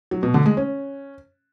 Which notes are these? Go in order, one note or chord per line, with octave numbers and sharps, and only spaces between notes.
F#3
B2
D3
G#3
C#4